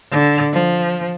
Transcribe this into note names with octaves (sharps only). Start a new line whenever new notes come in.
D3
F3